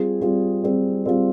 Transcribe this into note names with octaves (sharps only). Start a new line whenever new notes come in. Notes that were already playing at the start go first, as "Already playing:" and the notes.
Already playing: G3 C4 F4 G#4
G3 C4 F4 G#4
G3 C4 F4 G#4
G3 C4 F4 G#4